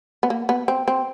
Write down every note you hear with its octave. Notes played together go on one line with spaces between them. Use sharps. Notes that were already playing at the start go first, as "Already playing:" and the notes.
B3
A#3
B3
C4
C4